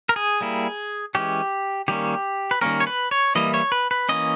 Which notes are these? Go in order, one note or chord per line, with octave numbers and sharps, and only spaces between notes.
A#4
G#4
G3 A#3 E4
E3 G#3 C#4 G4
D#3 G3 A#3 C#4 G4
B4
D#3 G3 A#3 C#4 A#4
C#5
B4
C#5
E3 G3 A#3 E4 D#5
C#5
B4
B4
E3 A#3 C#4 D#5